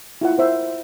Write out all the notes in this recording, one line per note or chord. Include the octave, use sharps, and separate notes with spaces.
E4 F4 F#5
A#4 C5 E5